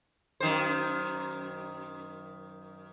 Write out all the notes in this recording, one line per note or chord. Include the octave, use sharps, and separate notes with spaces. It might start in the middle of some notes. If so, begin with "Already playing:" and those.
F#2 D#3 C5